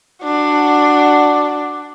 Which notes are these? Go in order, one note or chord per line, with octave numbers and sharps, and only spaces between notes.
D4 F#4